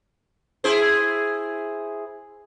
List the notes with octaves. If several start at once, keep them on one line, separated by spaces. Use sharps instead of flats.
E4 G#4 C5